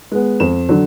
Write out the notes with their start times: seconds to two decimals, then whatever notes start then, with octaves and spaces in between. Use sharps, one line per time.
0.12 G#3 B3
0.40 F2 E7
0.69 D3 F#3